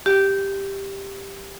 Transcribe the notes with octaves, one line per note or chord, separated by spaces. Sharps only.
G4